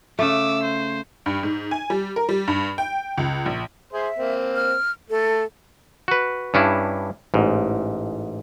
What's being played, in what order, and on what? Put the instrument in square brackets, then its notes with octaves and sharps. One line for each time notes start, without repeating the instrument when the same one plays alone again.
[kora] C#3 A3 [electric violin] D6 E6
[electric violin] C5
[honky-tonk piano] G2
G#2
G#5
G3
A#4
G3
G2
G5
C#2
A#1
[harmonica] G#4 C5 [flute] E5
[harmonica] A#3 C4
[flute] F6
[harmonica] A3 [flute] A4
[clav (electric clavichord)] F#4 B4
G2 C#4 D4 E4
A1 G#2